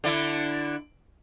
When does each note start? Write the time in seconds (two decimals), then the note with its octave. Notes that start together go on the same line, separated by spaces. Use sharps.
0.04 D3 D4 E4